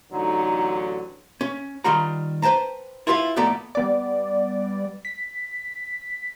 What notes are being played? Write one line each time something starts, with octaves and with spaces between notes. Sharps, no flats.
A1 D3 F#3 D#4
C#4
D#3 G3 F4 F#5 A#5
B4 C5 G5 A5 A#5
E4 F4 G4 B4 E5 F5
F2 A2 B3 A4 D5 A#5
G3 B3 D5
B6